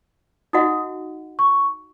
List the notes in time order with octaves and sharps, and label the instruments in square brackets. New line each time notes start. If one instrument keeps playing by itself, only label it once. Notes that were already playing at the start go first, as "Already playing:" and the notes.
[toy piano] D#4 F#4 D#5 F#5 [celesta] D#6
[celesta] C#6